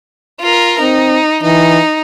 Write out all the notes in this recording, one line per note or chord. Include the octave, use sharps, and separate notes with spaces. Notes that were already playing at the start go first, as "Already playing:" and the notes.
F4 A#4
C4 D#4
E3 D#4